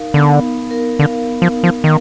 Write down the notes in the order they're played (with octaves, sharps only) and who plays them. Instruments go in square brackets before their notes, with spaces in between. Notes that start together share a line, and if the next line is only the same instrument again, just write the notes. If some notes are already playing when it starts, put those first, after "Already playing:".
Already playing: [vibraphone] D#4 A#4 F5
[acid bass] D3 [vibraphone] B3
[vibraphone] D#4
A#4
[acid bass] D3 [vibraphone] F5
[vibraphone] B3
[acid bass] F3
[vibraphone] D#4
[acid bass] F3
[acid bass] D#3 [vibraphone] A#4